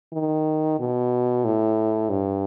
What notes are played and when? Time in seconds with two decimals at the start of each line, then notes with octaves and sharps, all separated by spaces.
0.13 D#3
0.79 B2
1.44 A2
2.10 G2